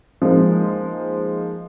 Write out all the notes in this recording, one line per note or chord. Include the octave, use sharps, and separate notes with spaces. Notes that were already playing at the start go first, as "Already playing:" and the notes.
F3 G#3 A#3 D#4